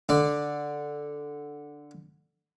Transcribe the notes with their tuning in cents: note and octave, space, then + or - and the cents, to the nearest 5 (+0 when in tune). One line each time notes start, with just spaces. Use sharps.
D3 +0 D5 +0